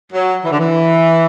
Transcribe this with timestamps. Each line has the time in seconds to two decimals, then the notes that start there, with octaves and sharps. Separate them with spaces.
0.13 F#3
0.44 E3
0.52 D3
0.59 E3